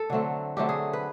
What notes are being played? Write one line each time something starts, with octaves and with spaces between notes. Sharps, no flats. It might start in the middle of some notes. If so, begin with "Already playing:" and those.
Already playing: A4
D3 F#3 A3 C4
D3 F#3 A3 C4 G4
G#4
B4